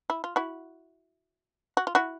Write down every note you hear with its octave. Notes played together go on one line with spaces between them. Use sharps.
E4
F4
E4 F#4
F#4
F4
E4 F#4